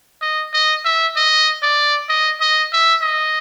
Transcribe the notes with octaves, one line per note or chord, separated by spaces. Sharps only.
D#5
D#5
E5
D#5
D5
D#5
D#5
E5
D#5